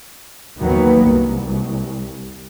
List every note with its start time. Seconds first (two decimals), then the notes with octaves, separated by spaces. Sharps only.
0.59 D#2 D#3 F#3 A#3 B3
1.05 C2